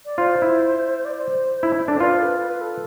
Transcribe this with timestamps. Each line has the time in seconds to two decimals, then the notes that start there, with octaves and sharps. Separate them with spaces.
0.05 D5
0.18 F4 C5
0.42 E4
1.05 D5
1.15 C5
1.63 E4
1.88 D4 A4
2.00 F4 B4
2.12 C5
2.19 A4
2.23 B4
2.36 B4
2.48 B4
2.61 A4